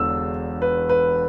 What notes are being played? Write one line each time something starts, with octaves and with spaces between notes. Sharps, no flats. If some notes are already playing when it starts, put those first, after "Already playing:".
Already playing: E1 E2 D3 E6
B4
B4